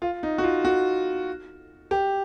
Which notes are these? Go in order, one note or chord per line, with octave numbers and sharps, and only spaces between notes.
F4
D#4
F#4
F4
F#4
G4